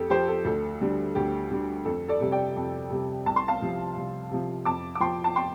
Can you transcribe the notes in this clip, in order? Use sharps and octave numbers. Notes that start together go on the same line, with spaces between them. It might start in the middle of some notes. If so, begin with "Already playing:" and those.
Already playing: F2 G4 A4
F3 G4 C5
A4
D2 A4
D3 G3
D2 G4
D3 G3
F2 A4
A4 D5
C3 G3
D5 G5
F2
C3 G3
C2 A5
C6
F5 A5
C3 F3
C2
C3 F3
F2 A5 D6
D6
F3 G5 C6
A5
G5 C6